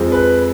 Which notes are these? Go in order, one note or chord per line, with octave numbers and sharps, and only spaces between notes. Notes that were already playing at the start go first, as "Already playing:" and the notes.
Already playing: F2 F3 G#3
B4